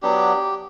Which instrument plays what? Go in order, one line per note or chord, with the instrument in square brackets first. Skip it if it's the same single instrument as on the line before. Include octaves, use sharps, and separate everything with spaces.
[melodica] F#3 B3 D4 G4